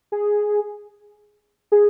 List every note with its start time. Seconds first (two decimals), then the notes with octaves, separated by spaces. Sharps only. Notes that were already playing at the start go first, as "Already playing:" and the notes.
0.12 G#4
1.72 G#4